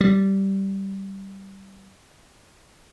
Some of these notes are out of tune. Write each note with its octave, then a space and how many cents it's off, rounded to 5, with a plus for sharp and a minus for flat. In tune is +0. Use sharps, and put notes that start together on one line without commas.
G3 -10